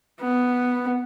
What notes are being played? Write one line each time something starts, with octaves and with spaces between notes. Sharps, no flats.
B3